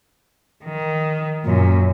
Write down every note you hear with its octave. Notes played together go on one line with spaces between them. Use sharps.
D#3
F#2 A#2